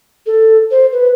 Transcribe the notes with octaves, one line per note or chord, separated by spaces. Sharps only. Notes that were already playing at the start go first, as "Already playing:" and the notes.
A4
C5
B4